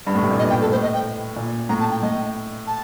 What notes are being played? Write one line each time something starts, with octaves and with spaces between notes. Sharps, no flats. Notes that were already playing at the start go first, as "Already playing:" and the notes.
G2
A2
C3
A#2
G2 D#5
G5
A4
A2 C5
D#5
G5
A#2
A2 A#5
A5
G5
A2 D#5
A5